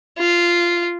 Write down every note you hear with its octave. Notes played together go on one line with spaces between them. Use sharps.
F4